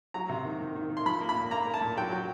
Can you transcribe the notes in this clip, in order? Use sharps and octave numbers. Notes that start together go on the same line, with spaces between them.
F#3 A#5
C3
D#3
D#3
D#3
D#3
C6
F3 B5
A#3
B5
A#2
A#3 A#5
A#3
A5
A#2
F#3 G5
F#3